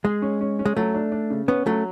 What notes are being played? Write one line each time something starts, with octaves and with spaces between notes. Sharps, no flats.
G#3 G#4
C#4
C#4
C#4
G#3
F#3 A3
D4
D4
C#3
B3 C#4
F#3 A3